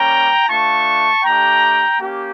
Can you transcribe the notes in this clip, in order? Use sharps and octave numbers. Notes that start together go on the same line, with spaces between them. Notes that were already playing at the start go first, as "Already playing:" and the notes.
Already playing: G3 A#3 C#4 G5 A#5
A3 D4 F4 A5 C#6
A3 D4 G4 G5 A#5
A#3 C#4 G4